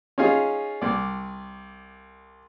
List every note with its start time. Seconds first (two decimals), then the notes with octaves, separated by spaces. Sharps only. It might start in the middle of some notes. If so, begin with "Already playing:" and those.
0.18 C#4 D#4 F4 G#4
0.82 C2 D5